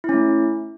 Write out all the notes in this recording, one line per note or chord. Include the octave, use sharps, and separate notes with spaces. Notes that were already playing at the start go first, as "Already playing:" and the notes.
A3 C#4 E4